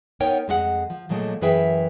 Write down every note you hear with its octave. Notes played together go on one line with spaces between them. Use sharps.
B3 D#4 A#4 C#5 G5
F2 G#3 F4 F#5
F3
A#2 F3 F#3 G#3 A3
F#2 E3 G#4 B4 E5 G5